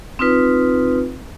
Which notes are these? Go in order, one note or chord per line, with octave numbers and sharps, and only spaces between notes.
C4 D#4 F4 B4